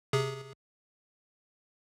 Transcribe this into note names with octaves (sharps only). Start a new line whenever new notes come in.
C3 G#4